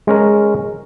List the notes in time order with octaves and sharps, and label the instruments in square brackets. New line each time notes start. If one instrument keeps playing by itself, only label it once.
[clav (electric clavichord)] G#3 C#4 A#4